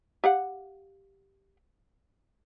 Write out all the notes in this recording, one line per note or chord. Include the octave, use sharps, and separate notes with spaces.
G4 F5 F#5